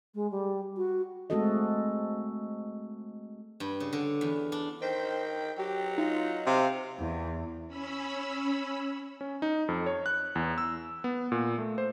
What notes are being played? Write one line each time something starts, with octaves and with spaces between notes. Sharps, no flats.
G#3
G3
F#4
G#3 A3 C4 F#4 A4 D#5
G2
C#3
D3
E2
D4
D#3 C5 G5
F#3 G4
D#4 F4
C3 F5
E2
C#4 B5 E6
C#4
D#4
F2
C#5
F#6
E2
E6
B3
A#2
A3
C5